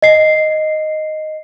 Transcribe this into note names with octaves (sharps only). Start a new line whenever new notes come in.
D#5 C7